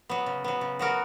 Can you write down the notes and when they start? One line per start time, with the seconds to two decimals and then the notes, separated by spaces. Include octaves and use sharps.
0.09 F#3 B3
0.26 C#3
0.44 F#3 B3
0.61 C#3
0.79 F#3 B3 F#4 A#4